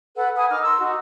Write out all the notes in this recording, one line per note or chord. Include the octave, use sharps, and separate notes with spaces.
A4 B4 F#5
F#5 G#5 B5 D#6
D#4 A#4 D6 F6
A#4 C6 E6
D#4 F#4